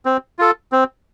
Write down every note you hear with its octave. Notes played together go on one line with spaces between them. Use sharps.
C4
F4 A4
C4